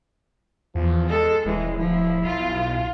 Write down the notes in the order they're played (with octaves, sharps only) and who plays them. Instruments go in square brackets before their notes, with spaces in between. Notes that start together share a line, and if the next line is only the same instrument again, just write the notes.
[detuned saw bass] E2 [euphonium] F3
[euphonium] G#3 [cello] A4
[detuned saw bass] D#1 [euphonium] E3 [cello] G#3
[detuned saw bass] D1 [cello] F3 [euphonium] E4
[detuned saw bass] B1 [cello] F4